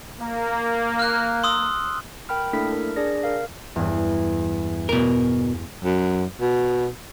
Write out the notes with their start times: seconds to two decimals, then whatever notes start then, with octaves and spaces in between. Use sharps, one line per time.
0.20 A#3
0.99 F6 F#6
1.44 C6 D#6 E6
2.29 A#4 G5 B5 F6
2.53 A3 A#3 D4 E4 A4 B6
2.72 A#4
2.96 D4 G#4 D5 A#6
3.23 A#4 F5
3.76 E2 G2
4.89 B2 A#4
5.84 F#2
6.41 B2